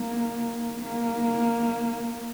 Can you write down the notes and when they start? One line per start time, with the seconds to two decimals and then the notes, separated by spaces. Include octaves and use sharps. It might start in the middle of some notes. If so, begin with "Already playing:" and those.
Already playing: A#3
0.83 A#3